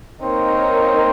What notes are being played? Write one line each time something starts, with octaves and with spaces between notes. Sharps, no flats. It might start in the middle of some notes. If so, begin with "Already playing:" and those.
A#3 C4 D#4 A#4 C#5